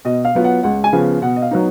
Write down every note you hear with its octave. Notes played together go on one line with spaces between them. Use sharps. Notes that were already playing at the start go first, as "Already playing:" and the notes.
B2 D#5
F5
F#3 B3 F4
F#5
C#2 F#5
G#5
C#3 F3 B3
B2 F#5
D#5
F5
F#3 B3 D#4